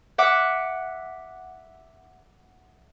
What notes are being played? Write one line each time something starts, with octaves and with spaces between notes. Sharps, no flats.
E5 F#5 D6